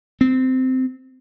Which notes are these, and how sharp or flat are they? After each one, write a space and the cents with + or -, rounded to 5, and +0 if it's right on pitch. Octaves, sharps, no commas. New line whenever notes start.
C4 -15